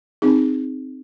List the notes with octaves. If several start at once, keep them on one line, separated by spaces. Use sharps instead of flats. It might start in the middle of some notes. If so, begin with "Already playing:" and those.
C4 D#4 G#4